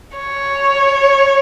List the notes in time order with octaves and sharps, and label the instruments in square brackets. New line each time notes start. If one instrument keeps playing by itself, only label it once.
[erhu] C#5